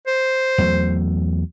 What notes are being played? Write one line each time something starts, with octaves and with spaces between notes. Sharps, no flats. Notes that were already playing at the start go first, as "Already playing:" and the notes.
C5
E2 F#3 A3